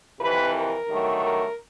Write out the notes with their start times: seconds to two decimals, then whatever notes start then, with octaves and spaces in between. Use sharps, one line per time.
0.20 F2 C3 E3 B4
0.54 A#4
0.89 G2 D#3 F#3 A3
1.24 A#4